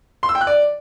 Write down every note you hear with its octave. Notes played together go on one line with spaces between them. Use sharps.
C6
E6
G5
F#6
D5